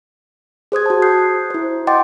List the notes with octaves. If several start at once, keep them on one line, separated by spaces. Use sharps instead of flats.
G#4 C5 D#6 G#6
F#4 A5
D#6 F#6 G6 C7
E4 C5
D#5 F#5 G5 C6 D6 A6